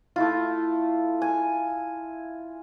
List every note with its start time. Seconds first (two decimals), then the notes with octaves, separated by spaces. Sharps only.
0.16 A3 E4 F4
1.22 G#5